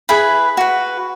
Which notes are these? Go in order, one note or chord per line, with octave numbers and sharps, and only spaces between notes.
E4 G#4 B4 B5
F#4 B4